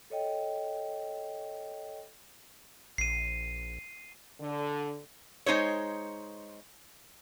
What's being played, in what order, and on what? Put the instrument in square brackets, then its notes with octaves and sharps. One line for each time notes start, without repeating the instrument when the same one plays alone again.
[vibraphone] A4 C#5 D#5 G5
[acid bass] A#1 [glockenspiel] C7 D#7
[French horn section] D3
[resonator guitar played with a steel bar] G#3 D#4 C5 C#5